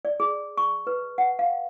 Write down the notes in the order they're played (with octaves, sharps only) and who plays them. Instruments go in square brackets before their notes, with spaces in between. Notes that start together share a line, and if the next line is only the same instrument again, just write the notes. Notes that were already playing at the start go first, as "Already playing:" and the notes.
[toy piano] D5
G#4
C#6
B4
F#5
F5